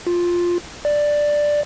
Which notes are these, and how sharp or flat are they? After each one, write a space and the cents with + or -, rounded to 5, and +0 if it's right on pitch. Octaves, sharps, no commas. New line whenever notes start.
F4 +5
D5 +5